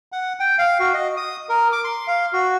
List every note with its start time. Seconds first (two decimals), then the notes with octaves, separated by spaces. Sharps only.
0.12 F#5
0.40 G5
0.58 F5
0.80 F#4
0.94 D#5
1.17 D#6
1.49 A#4
1.72 D6
1.84 C6
2.07 F5
2.33 F#4